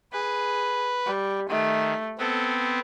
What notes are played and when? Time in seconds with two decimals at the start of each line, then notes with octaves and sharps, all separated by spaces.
0.12 G#4 B4
1.05 G3
1.49 D#3 A3
2.19 B3 C4 A4